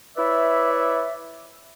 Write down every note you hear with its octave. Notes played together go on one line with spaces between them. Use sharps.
E4 B4 C#5 D5 E5